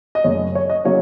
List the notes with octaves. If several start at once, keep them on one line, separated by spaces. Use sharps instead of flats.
D#5
F#2 C#3 A3 C#5
C#5
D#5
C#3 F#3 A#3 C#5